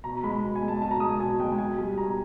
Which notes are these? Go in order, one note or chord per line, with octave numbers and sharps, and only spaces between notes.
B2 A#5
G#3 B5
B2
G#5
G#3
A5
B2 A5
A#5
G#3 D#6
A5
B2 G#5
G#3 G5
G5
B2 G#5
G3
B2 A#5